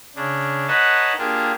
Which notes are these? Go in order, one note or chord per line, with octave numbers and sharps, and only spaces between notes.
C#3 D4
D#4 B4 C#5 D#5 F#5 A5
A#3 D4 F4 G4 G#4